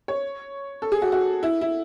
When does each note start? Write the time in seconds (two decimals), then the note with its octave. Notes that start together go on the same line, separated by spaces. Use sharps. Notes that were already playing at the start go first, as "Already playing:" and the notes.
0.08 C#5
0.82 A4
0.92 G#4
1.02 F#4
1.12 F#4
1.43 E4
1.61 E4